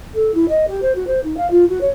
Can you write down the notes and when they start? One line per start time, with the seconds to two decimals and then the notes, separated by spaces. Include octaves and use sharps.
0.14 A4
0.34 E4
0.48 D#5
0.68 G4
0.82 C5
0.95 F#4
1.07 C5
1.23 D#4
1.37 F5
1.51 F4
1.69 F#4
1.81 C#5